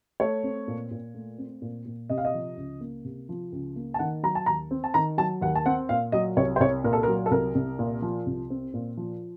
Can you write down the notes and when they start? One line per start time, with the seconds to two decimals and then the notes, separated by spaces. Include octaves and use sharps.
0.20 A3 C#5
0.44 C4
0.68 A#2
0.91 A#2
1.14 A3
1.38 C4
1.62 A#2
1.86 A#2
2.10 C3 D#5
2.18 F5
2.25 D#5
2.34 F3
2.57 C#2
2.81 A#3
3.05 C3
3.29 F3
3.52 C#2
3.76 A#3
3.94 A5
3.99 D#3 F#5
4.23 F#3 A#5
4.35 A5
4.46 D#2 A#5
4.71 C4
4.84 A5
4.94 D#3 A#5
5.18 F#3 A5
5.42 D#2 F#5
5.55 A5
5.66 C4 F#5
5.89 A#2 F5
6.12 F#3 D#5
6.37 C2 C#5
6.56 C5
6.60 C2 C#5
6.84 A#2 A#4
6.93 A4
7.03 A#4
7.08 F#3
7.26 A4
7.31 C2 A#4
7.55 C2
7.79 A#2
8.02 F3
8.26 C2
8.50 C4
8.74 A#2
8.97 F3